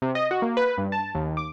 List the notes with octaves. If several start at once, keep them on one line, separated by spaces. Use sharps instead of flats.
C3
D#5
F#4
A#3
B4
G2
A5
D#2
D6